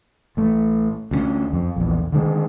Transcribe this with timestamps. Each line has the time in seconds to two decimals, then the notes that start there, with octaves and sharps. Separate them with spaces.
0.37 A1 A3
1.11 D2 G3 C#4
1.53 F2
1.76 A#1 E2
2.12 D3 D#3 G#3